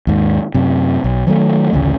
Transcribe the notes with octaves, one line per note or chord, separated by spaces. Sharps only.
D#2 G#2
F#2 C3
B1
D#3 F#3 G3 A3
A1 D2 C#3